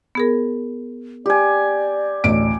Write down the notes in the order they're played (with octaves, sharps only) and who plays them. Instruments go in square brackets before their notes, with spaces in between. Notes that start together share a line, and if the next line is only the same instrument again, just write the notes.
[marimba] B3 G#4 A#4
[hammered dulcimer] G4 G#5 [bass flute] D5
[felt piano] A1 D2 D7